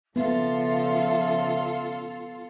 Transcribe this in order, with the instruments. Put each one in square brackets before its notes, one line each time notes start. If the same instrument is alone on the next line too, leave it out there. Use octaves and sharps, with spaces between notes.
[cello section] C#3 F3 [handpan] B3 [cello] F4 A4 [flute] E5